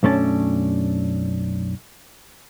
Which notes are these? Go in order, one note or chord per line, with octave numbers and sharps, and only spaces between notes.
B1 F#2 A3 C#4 D4 A5